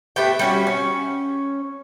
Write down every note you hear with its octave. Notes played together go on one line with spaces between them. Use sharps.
A3 B3 G4 G5
G3 C#4 F#4
C#4